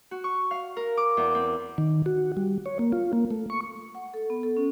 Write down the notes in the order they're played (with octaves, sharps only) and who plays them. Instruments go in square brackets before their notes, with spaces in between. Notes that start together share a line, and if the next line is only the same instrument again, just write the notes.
[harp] F#4
C#6
F5
A#4
D6
E2
C4
[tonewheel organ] D#3
F#4
G3
C#5
A#3
F4
A#3
A3
C#6
[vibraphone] F#5
A4
B3
A4
C#4